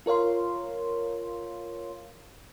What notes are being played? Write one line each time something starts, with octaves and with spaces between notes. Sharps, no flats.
F4 A#4 C#5 F5 C6